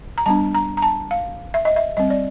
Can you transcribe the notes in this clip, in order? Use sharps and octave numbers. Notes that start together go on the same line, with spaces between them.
A#5
G3 B3 D4 A5
A#5
A#5
A5
F5
E5
D#5
E5
G3 C4 D#5
D5